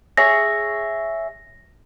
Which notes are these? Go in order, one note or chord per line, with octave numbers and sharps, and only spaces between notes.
G#4 C#5 E5 A#6